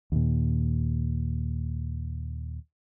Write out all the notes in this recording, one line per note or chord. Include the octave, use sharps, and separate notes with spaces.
D#2 A#2